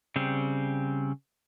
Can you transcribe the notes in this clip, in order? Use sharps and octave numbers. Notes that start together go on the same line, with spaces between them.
C#3 G3 C4